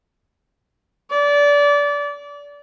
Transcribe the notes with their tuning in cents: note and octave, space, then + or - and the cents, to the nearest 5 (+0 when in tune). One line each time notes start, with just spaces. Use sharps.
D5 -25